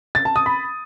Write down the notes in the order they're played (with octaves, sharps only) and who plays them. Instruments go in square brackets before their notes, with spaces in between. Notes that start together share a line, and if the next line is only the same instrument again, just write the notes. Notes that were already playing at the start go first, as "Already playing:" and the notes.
[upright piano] A6
A5
D#6
B5